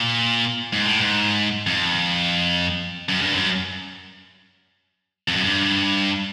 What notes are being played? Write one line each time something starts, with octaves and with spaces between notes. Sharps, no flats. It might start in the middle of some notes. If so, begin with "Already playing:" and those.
Already playing: A#2
G#2
A2
G#2
F2
F#2
G2
F#2
F2
F#2
G2